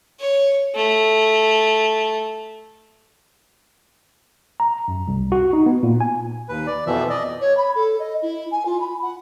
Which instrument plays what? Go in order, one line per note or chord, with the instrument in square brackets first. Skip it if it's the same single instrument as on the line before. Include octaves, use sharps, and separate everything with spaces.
[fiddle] C#5
A3
[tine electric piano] A#5
F#2
C2
F#4
D#4
B3
A#2
G#5
[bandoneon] D#2 B4
D5
F2 B2 E3 F3 E5
D5 D#5
[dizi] C#5
B5
A4
D#5
E4
G#5
F4
B5
F#5